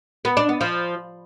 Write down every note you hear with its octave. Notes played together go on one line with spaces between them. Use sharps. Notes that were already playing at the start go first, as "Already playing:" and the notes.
B3
D4
B3
F3